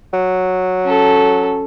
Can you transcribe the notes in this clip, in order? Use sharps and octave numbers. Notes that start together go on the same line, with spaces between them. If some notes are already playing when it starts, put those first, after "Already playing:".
F#3
C#4 A4